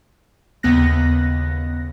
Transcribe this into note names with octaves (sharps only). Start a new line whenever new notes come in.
D#2 C#3 B3 F#6 A#6